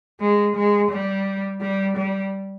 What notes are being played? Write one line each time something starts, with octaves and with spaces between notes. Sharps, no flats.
G#3
G#3
G3
G3
G3